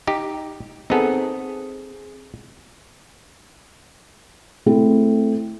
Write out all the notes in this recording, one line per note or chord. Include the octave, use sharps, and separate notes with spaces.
D#4 G4
B3 C4 D#4 G#4 A4
A3 C4 E4